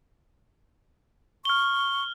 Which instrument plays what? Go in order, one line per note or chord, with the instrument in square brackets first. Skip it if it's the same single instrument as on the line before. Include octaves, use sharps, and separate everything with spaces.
[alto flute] C#6 [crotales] F6 G7